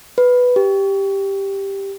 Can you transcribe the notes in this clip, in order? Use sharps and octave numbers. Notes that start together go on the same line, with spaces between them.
B4
G4